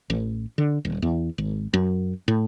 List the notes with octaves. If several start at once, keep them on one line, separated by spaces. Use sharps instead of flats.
A1
D3
D#1
E2
G#1
F#2
A2